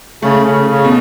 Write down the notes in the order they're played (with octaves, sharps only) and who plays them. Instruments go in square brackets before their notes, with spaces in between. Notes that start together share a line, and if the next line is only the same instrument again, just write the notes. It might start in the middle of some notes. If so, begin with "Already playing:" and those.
[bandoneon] C#3 [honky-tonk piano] A3
[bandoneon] C#3
C#3
[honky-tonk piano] B2